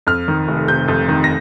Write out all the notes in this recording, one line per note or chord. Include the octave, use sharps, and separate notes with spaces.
F2 F6
D#3
F1
C3 G6
F2
D#3
A#6